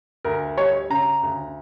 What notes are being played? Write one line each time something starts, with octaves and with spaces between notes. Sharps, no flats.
D2 A#4
G3 C#5
C#3 A#5
D2